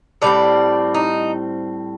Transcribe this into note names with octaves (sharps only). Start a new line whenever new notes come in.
A2 G3 C4 D5
D#4